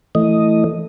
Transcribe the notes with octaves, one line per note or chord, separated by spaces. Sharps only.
E3 A3 D#5